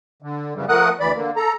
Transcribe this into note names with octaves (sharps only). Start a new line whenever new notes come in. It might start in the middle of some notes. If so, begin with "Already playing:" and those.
D3
F#2 C#3 E3 G3
F3 A3 A#4 F#5 D#6 F#6
D2 E3 D5 B5
D3 A#3
A4 A#5